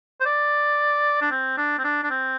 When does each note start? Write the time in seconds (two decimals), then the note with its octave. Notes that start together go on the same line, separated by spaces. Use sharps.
0.21 C5
0.25 D5
1.22 D4
1.31 C4
1.57 D4
1.79 C4
1.84 D4
2.04 D4
2.10 C4